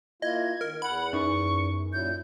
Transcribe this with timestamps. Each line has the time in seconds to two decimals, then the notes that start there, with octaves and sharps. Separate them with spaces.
0.22 A#3 E4 F4 D#5 G#6
0.61 D#3 A#4
0.82 E2 F#5 B5
1.13 F#2 D#4 C#6
1.93 A#2 F#3 E4 G6